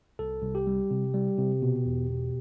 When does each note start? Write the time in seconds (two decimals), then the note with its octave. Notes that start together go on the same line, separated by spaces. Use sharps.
0.19 C2 A4
0.43 C2
0.55 G4
0.67 G3
0.91 C3
1.14 G3
1.38 C3
1.62 B2
1.86 E2
2.10 B2